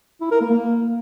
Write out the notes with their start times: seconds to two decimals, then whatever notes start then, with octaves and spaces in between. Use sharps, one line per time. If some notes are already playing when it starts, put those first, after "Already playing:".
0.21 E4
0.31 A#4
0.41 A#3
0.51 A#3